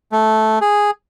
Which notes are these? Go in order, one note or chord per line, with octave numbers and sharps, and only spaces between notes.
A3
G#4